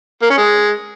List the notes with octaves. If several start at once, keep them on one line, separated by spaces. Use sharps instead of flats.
A#3
C#4
G#3